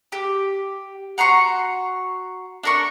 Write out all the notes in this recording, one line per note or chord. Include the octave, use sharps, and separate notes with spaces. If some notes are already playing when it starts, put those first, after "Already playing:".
G4
F#4 A#5 C6 C#6
D4 A#4 C#6